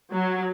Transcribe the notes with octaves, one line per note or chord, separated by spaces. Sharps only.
F#3